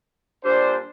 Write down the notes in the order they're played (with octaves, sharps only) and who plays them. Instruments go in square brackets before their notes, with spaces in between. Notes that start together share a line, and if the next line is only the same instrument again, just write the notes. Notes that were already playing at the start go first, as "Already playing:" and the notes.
[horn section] A#2 G3 D4 C5